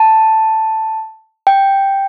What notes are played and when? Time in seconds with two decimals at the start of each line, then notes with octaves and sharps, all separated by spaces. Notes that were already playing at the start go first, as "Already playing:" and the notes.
Already playing: A5
1.47 G5